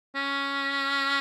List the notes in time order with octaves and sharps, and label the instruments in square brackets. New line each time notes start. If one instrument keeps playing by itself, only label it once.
[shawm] C#4